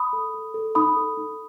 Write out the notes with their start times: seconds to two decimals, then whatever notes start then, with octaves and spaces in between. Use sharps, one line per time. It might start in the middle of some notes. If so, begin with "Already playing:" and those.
Already playing: B5 D#6
0.13 A4
0.34 A4
0.54 A4
0.75 D#4 B5 D#6
0.96 A4
1.17 D#4